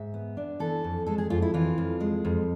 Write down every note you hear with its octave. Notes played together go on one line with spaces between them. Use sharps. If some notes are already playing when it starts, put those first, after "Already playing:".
Already playing: G#2 E5
B3
D4
E3 A4
F2
G#3 A4
G#4
F2 F4
E4
E3 F4
F2
G#3
F2